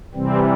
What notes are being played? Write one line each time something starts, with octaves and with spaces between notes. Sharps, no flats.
C3 E3 G3 C4